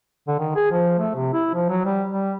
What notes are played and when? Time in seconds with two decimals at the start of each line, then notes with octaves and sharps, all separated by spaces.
0.28 D3
0.39 D#3
0.56 G#4
0.71 F3
0.99 A3
1.15 C3
1.33 E4
1.54 F3
1.69 F#3
1.85 G3
2.09 G3